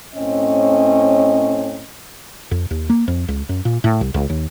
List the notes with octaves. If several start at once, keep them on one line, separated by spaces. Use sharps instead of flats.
A2 C4 C#4 D#5
F2
D#2
A#3
F2
C#2
F#2
A#2
A2
C2
C#2
D#2